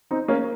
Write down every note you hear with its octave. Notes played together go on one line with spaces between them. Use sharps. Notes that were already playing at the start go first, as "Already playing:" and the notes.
C4 D#4
A#3 C#4